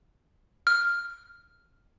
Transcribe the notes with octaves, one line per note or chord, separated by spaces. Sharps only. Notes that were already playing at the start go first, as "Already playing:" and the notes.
F6